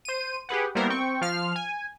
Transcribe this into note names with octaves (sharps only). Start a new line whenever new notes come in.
C5 D#7
G4 G#4 B4 F#5
G3 A#3 B3 E4 A#4 C5
C4 G5 C#6
F3 F5 F6
G#5